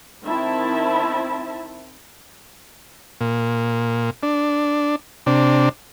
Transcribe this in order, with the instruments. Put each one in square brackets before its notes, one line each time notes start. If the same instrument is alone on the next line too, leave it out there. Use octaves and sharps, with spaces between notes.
[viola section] D#3 C4 E4 E5 A5 B5
[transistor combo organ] A#2
D4
C3 D4